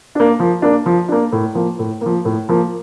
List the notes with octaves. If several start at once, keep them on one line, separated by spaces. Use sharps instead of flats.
A#3 D4
F3
A#3 D4
F3
A#3 D4
A2
F3 A#3
A2
F3 A#3
A2
F3 A#3